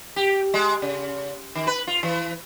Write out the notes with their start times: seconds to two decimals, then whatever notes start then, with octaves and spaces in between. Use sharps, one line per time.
0.16 G4
0.54 G#3
0.82 C#3
1.55 D#3
1.67 B4
1.87 F4
2.03 E3